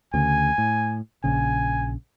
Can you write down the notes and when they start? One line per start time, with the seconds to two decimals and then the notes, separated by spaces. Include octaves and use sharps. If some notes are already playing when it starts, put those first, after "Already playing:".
0.14 D2 C#3 G#5
0.58 A2
1.24 A#1 C#3 G#5